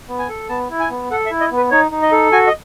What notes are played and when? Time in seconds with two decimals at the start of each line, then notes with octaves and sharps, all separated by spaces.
0.09 B3
0.19 G#5
0.29 A4
0.49 B3 A5
0.70 E4
0.80 G#5
0.90 B3
1.11 A4 F#5
1.26 E5
1.31 E4
1.41 D#5
1.51 B3
1.57 B4
1.71 D#4 C#5
1.91 D#4
2.02 D#5
2.12 A4
2.32 F#4 G#5
2.47 D#5